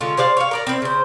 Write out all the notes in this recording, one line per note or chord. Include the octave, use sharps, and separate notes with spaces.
D3 G#3 C#4 F4
G#4 C5 D5 F5
C#5 F5
A#4 D5 A#5
C4 E4
C#3 C5